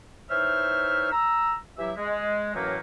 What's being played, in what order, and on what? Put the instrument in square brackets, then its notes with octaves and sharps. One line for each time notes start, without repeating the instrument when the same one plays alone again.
[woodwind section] E3 D#4 C5 C#5 E5 F6
A#5 E6
E3 F#3 E4 G4 E5
G#3
F#2 A2 E3 F#3 A3 A#3